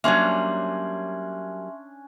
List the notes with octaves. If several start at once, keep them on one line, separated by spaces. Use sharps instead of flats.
F#3 G3 A#3 C#4 D4 E5 G#5 C6